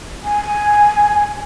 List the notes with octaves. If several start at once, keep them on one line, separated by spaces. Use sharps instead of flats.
G#5